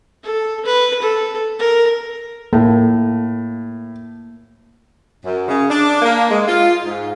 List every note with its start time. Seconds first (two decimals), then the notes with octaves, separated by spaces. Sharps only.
0.23 A4
0.65 B4
1.02 A4
1.59 A#4
2.53 A2 A#3
5.24 F#2
5.48 C#3
5.70 D4
6.02 A#3
6.31 G#3
6.47 F4
6.84 G#2